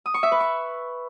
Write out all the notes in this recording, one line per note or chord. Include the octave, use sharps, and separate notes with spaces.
D#6
C#6
E5
B4
C#6